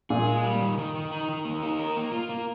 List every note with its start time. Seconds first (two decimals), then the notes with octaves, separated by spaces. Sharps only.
0.10 A#2 G#4
0.27 G#3
0.44 G3
0.61 D#3
0.78 D#3
0.95 D#3
1.11 D#4
1.29 D#3
1.45 A#3
1.63 D#4
1.79 A#4
1.96 A#3
2.12 F4
2.29 A#3